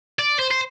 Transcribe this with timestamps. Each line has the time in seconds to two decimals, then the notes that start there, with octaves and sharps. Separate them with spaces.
0.19 D5
0.39 C5
0.51 C5